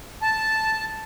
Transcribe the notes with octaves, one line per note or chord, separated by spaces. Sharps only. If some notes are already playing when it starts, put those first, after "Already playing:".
A5